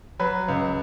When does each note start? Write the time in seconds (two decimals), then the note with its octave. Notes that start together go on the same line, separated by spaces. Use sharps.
0.20 F#3 B4
0.48 C#2